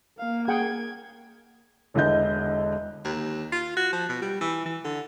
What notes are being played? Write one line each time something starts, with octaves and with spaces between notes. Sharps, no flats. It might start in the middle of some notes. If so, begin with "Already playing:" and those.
A#3 F5
G#4 F#5 G5 G#6
E1 D3 E3 D#5 G6
D#2
F4
F#4
F3
B2
G3
E3
E3
D3